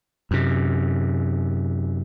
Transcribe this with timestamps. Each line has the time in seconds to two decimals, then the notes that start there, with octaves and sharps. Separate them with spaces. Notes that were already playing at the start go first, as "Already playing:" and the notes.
0.31 F#2 C3